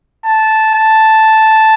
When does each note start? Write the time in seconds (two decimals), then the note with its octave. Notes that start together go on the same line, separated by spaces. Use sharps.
0.25 A5
0.75 A5